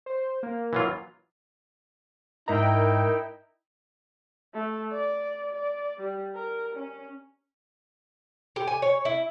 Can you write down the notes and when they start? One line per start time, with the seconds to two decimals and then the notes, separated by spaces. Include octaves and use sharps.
0.06 C5
0.43 A#3
0.73 E3 F#3 F4
2.48 G#2 D#4 E4 A#4 G5 A#5
4.54 A3
4.92 D5
5.53 D5
6.01 G3
6.35 A#4
6.75 C#4
8.56 G4
8.67 G#5
8.82 C#5
9.05 E4